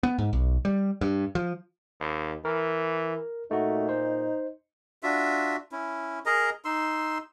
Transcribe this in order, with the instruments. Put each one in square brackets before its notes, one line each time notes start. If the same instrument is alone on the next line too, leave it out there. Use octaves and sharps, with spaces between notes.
[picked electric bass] B3
G#2
B1
G3
G2
F3
[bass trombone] D#2
[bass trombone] E3 [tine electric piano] A#4
[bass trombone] A#2 [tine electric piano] A3 F#4 [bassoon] D#4
[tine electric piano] C5
[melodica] D4 F4 F#4 E5
C#4 E4
G#4 A#4 D#5 A#5
D#4 C6 E6